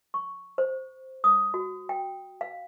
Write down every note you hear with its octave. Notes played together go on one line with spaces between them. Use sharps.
C#6
C5
D#6
F#4
G5
F5